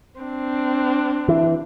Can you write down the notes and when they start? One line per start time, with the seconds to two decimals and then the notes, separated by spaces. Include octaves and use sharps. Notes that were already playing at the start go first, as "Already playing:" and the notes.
0.20 C4 D4
1.28 E3